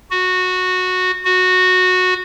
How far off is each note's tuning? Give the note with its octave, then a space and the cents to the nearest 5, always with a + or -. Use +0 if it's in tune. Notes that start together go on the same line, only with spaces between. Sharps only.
F#4 -10
F#4 -10